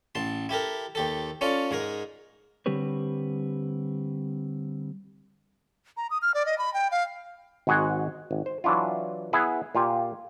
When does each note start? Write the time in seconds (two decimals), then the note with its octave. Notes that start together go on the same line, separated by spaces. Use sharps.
0.15 A1 A5 C6
0.49 E4 G4 A4 A#4
0.95 D#2 G4 A4
1.41 C#4 F4 A4 D5
1.71 G#2 G#4 A#4
2.66 D3 G3 C4 G4 B4 C#5
5.97 A#5
6.11 D#6
6.22 F6
6.34 D5
6.46 D#5
6.58 B5
6.74 G5
6.91 F5
7.67 G#1 G#2 F#4 G#4 F#5 G#5
8.31 G#1
8.46 C5
8.64 E3 F#3 D4 E4 F4
9.33 B3 E4 G#4 F#5
9.75 A#2 F4 G4 G#5